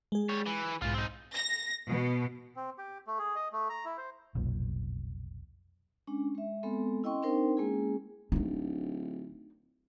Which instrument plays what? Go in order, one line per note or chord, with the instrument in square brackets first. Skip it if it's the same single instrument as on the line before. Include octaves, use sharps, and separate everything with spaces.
[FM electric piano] G#3 G#4
[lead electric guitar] G3 C#5
E3
[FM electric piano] B1 G#2 [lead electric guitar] E3 F4
[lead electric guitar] C4 D#4
[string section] A#6
B2
[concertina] C4
G4
A3
G#4
D#5
A3
A#5
E4
C5
[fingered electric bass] F1 B1 A#2
[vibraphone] G#3 C#4 D4
G#3 E5
G#3 B3 C4 A4
C#4 E4 D#5 G5 C6 C#6
C4 D4 D#4 A#4 C5 G5
G#3 A#3 C#4 E4 G#4
[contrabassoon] D1 [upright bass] D4 D#4